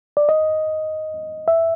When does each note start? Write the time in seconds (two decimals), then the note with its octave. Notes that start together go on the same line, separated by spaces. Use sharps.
0.17 D5
0.29 D#5
1.48 E5